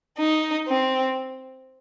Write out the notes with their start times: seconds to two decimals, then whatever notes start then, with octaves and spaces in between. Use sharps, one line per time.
0.19 D#4
0.68 C4